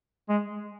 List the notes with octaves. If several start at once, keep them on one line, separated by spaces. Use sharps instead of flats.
G#3